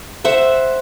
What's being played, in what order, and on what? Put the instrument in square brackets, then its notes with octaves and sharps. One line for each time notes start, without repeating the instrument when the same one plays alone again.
[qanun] C5 E5 F#5